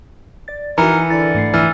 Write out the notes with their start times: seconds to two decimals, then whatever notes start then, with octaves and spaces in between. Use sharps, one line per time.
0.48 D5 A6
0.78 E3 D#4 F#4 A#4 A#5 B5 C#7
1.10 D3 E4 A6 C#7
1.35 G#2 A3 C7
1.54 E3 E6 F6 A6